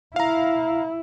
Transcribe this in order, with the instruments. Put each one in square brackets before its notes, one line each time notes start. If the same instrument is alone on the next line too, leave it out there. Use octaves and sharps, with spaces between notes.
[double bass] E4 [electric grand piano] F5 A#5